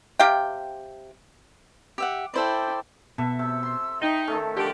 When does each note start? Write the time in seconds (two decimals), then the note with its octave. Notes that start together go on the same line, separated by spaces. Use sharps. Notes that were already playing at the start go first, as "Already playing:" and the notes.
0.20 C3 G4 F5 G5
1.98 G4 E5 F#5
2.34 E4 A4 C5 D5 G5
3.18 B2 A4 E5
3.39 C3 E6
3.63 C6
4.02 D#4 D#5 E5 G5
4.28 D#3 A3 C#4 A4
4.57 D3 F3 G4